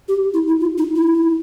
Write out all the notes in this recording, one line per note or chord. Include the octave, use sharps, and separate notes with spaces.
G4
E4
E4
F4
D#4
E4